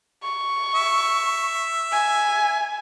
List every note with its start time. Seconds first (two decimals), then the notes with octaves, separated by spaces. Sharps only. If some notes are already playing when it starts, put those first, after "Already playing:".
0.23 C#6
0.75 E5
1.92 G#5